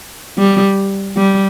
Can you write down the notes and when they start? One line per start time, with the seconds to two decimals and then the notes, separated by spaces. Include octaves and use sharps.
0.38 G3
1.17 G3